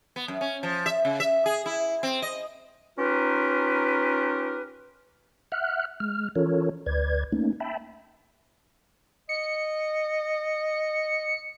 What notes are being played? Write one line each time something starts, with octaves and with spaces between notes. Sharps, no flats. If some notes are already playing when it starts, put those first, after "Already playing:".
B3
F#2
C#4
F3
E5
C#3
E5
G#4
E4
C4
D#5
C#4 D#4 F4 G4 A#4 B4
E5 F#5 F6 F#6
G#3 F6
E3 C#4 F4 A4 A#4 C#5
D2 B4 D5 G#6
A3 A#3 C#4 D#4
E5 G5 A5 B5
D#5 C#7